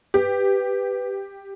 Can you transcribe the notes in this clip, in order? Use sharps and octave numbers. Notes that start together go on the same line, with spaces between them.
G4 B4